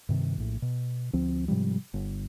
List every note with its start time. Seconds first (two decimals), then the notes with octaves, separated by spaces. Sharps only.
0.09 G2 C3 D#3
0.37 A#1 A2
0.62 B2
1.13 D2 F3 C4
1.48 G#2 C3 F3 G3
1.94 G1